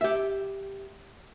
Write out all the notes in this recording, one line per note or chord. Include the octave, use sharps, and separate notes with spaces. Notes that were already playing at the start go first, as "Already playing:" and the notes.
G4 E5